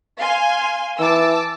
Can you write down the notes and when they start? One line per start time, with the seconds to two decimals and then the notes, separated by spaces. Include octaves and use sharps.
0.18 F5 G#5 C6
0.99 E3 A5 D6 E6